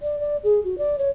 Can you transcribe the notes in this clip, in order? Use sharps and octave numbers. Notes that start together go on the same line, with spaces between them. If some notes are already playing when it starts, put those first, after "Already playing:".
D5
D5
G#4
F#4
D5
C#5